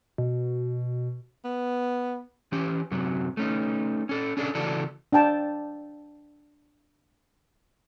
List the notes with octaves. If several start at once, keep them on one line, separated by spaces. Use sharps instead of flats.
B2
B3
E3 C#4 G4
F#2 C3 F#3
A3 C#4 D#4
C#4 A4
C#4 D4 G#4 A4
C#3 E3 F#4 A4 D5
D4 F5 G5 A5